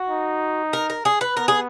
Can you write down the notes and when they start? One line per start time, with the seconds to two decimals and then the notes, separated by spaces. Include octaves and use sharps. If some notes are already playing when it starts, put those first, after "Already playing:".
Already playing: F#4
0.10 D#4
0.73 A#4
0.90 A#4
1.05 G#4
1.21 B4
1.36 B3 A#4
1.48 G#4